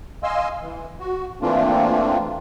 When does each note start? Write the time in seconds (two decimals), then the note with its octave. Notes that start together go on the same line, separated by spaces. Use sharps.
0.23 D#5 F5 G#5 C6 E6
0.62 E3
1.00 F#4
1.42 E3 A3 A#3 C4 D4 F4